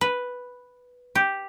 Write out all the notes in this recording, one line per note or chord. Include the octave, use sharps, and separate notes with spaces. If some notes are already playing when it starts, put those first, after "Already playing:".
B4
G4